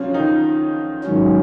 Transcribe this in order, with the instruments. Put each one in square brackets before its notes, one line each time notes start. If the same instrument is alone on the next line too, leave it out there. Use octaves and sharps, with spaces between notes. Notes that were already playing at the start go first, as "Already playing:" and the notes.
Already playing: [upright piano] C#3 F3 F#3 C#4 F4
D#3 D#4
[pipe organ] G#2 D#3 F#3 C#4